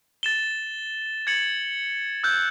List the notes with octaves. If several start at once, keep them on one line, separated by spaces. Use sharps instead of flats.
A6 E7 G7
G#6 A6 C#7 F#7
E6 F#6 G6